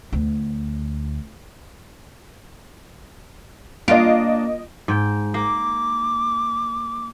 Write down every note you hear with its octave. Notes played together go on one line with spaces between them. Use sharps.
D2 B3
A#3 D4 F4 D#5 D7
G#2 G5
A#3 D6